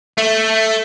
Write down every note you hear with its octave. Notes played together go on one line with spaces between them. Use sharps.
A3